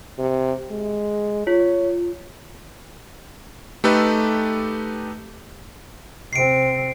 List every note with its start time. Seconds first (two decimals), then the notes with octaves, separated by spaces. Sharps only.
0.19 C3
0.70 G#3
1.47 F4 C#5
3.84 A3 D#4 G4 A4 B4
6.33 C3 C4 C7 D7